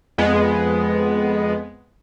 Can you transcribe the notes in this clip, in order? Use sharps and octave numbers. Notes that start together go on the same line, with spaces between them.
F2 G#3 B3